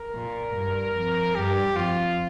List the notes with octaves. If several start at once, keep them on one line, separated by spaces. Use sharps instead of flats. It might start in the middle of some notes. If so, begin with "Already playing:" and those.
Already playing: A#4
A#2
G2
F2
G2 G4
F2 F4